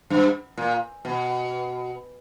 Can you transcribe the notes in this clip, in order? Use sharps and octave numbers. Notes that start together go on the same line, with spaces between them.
G2
A#2
B2